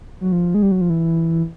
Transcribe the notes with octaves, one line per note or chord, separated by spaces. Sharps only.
F#3
F3
G#3
G3
F#3
F3
E3